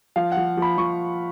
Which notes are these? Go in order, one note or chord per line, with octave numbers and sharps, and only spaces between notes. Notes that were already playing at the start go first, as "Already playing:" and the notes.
F3 F5
F#5
F3
F3 B5
F3 C#6